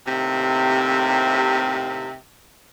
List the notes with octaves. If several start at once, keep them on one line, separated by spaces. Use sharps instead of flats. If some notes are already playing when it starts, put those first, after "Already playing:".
D#2 A2 C3